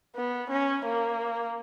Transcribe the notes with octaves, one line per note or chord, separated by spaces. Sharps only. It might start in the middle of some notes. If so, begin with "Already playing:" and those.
B3
C#4
A#3